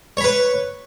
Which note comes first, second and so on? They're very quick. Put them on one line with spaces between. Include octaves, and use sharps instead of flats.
C#5 B5 B4